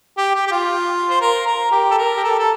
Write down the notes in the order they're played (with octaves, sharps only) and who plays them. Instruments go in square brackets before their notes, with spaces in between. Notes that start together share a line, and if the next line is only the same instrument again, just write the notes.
[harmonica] G4
G4
G4
F4
C5
A#4
A#4
G4
A4
A#4
G4
A4
A4